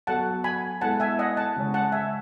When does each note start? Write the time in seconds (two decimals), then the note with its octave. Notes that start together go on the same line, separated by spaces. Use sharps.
0.07 F#3 B3 F#4 A4 F#5 A5
0.44 G#5 B5
0.81 G#3 B3 E4 A4 F#5 A5
1.00 E5 G#5
1.19 D#5 F#5
1.37 F#5 A5
1.56 C#3 G#3 C#4
1.74 F#5 A5
1.92 E5 G#5